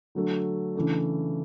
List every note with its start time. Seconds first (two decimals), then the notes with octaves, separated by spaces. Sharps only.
0.15 D3 F#3 A3
0.76 C#3 E3 A3 D4